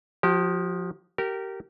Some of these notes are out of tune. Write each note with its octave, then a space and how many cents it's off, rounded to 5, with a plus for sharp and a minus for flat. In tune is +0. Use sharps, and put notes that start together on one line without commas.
F3 +20 G4 -30
G4 -25 A#4 -20